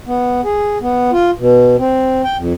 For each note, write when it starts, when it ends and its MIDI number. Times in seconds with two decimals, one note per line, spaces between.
0.07 0.41 59
0.44 0.78 68
0.82 1.11 59
1.13 1.31 65
1.39 1.76 47
1.78 2.22 60
2.24 2.37 79
2.37 2.53 41